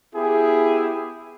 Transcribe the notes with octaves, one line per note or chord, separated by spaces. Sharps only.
B3 E4 G4 G#4